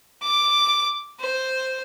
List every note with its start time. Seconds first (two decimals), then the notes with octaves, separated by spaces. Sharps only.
0.23 D6
1.20 C5